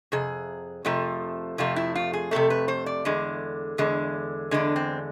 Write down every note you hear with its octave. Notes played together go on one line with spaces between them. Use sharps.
F2 C3 G#4
F2 C3 F3 A3
F2 C3 F3 A3 F4
E4
F4
G#4
F2 C3 F3 A3 A4
B4
C5
D5
E2 D3 G#3
E2 D3 G#3
E2 D3 G#3 D4
C4